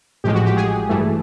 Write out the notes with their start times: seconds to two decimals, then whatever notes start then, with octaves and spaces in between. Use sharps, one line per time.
0.24 A1 A2 F3 G#3 G4
0.35 F#4
0.45 G4
0.57 G#4
0.89 G2 E3 A3